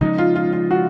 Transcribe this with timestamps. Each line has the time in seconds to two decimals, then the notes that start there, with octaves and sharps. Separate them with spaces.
0.01 C#3 F3 G#3 C#4 D#4
0.18 F4
0.35 F4
0.52 F4
0.71 F#4